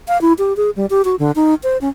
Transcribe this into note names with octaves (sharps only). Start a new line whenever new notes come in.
F5
E4
G4
G#4
G3
G4
F#4
D3
D#4
C5
C#4